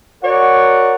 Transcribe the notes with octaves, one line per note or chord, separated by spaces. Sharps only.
F#4 A#4 C#5 D5 F#5